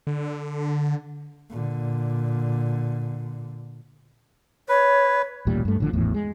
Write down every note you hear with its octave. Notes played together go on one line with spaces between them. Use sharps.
D3
A#2 D3
B4 C#5
D#1 A1 A#2 G3
G2 A3
A1 D3 F3
G#1 E2 A2
G#3